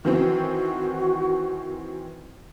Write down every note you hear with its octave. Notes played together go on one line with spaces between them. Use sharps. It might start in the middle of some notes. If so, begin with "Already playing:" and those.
D#3 E3 C4 F#4